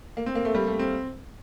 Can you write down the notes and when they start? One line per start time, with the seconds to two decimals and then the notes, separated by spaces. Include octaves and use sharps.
0.17 A#3
0.26 C4
0.35 A#3
0.45 A3
0.55 G3
0.67 A3
0.79 C4